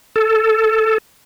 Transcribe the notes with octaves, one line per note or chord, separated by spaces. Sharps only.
A4